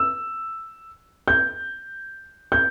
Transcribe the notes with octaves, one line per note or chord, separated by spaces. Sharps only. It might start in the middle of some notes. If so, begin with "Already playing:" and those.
Already playing: E6
G6
G6